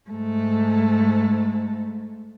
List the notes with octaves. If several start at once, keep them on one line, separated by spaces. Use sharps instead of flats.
G#2 A3